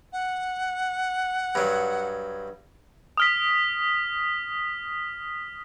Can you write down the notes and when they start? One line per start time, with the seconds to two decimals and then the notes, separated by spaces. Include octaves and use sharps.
0.13 F#5
1.55 G2 F#3
3.17 D#6 F6 B6